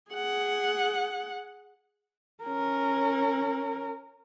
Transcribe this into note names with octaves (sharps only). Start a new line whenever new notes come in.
G#4 F#5
C#4 A#4